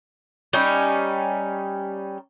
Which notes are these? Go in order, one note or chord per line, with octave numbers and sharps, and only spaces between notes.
G3 C#4 D#4